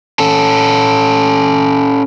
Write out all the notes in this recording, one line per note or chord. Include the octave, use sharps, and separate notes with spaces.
C#4 A4